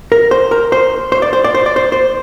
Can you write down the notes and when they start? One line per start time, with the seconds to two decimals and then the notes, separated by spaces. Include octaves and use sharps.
0.12 A#4
0.31 C5
0.51 A#4
0.72 C5
1.12 C5
1.22 D5
1.33 C5
1.44 D5
1.55 C5
1.66 D5
1.76 C5
1.92 C5